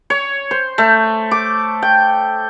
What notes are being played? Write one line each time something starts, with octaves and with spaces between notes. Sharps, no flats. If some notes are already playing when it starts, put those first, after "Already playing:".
C#5
C5
A3
D6
G5